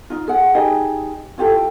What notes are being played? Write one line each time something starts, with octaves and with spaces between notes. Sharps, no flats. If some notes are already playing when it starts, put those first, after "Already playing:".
D#4 F4
G#4 F#5
D#4 G4 G#4 D#5
E4 F4 G4 A4